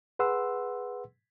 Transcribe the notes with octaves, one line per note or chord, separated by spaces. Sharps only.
G#4 B4 F#5 C6 E6